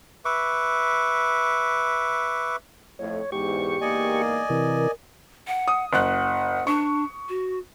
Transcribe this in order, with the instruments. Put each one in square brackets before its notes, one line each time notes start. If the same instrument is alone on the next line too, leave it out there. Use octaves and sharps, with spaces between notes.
[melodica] B4 E5 C#6 D6
[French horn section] F2 A2 [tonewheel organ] C#5
[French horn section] E2 G#2 [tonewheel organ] G4 C#6
[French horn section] E2 G#2 A#3 [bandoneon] D5 D#5 G#5
[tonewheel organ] C3 E3 [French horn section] A#4
[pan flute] F#5
[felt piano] D#6
[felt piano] F#1 F#6 [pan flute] F#5
[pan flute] D4 [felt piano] C#6
[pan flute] F#4